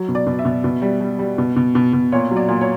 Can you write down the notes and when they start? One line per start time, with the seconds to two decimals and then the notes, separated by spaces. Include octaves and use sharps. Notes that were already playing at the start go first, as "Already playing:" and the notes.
Already playing: F#3
0.08 B2
0.15 D5
0.27 B2
0.39 E5
0.45 B2
0.64 B2
0.82 G3
1.01 G3
1.19 G3
1.38 B2
1.56 B2
1.75 B2
1.93 B2
2.12 A#2 C#5
2.31 F#3
2.36 D5
2.48 A#2
2.61 C#5